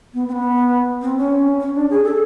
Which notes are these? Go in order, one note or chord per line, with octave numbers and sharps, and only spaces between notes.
B3
C4
B3
C4
C#4
C#4
D4
G#4
A4